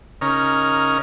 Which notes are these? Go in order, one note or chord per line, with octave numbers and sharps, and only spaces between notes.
C#3 C#4 D#4 A#4 F6